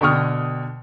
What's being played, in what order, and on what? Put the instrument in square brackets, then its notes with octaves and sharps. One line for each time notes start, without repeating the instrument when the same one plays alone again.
[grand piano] B2 D3 G5 C#6 D#6 F6